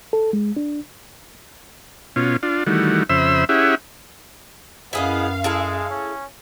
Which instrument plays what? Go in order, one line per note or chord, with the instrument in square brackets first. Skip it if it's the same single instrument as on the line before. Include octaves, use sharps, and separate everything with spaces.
[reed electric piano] A4
G#3
D4
[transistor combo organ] B2 C#4 F4
D4 F4
D#3 E3 G3 A3 F#4
F2 C#3 C5 E5 B5 E6
C#4 E4 G4 G#4 E5 F#5
[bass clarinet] F#2 [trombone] B3 [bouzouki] E4 G#4 D#5 [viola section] F5
[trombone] G#3 [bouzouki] E4 G#4 A4
[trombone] C#4